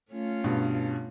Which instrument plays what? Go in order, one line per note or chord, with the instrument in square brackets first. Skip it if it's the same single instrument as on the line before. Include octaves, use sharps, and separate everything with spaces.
[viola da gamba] A3 C#4 F4
[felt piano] G2 B2